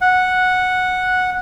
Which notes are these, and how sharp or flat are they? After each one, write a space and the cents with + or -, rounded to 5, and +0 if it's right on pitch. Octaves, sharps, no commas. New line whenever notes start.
F#5 -10